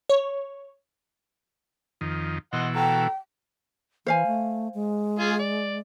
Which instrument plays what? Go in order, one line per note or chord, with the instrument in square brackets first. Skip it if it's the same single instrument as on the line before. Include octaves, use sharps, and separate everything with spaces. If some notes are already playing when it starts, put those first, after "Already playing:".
[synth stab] C#5
[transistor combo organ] F2 D#3
[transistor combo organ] B2 E3 [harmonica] D#5 F#5 C6
[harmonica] F#4 A4 A#5 [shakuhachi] G5
[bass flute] E3 [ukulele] C5 F5 G#5
[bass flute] A3
G#3
[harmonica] F4 G#4 G#5
D5